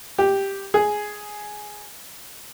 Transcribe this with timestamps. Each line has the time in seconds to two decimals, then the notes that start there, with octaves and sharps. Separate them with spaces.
0.18 G4
0.74 G#4